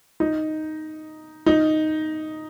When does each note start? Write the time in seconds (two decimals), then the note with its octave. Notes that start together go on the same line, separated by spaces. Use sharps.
0.20 D#4
1.46 D#4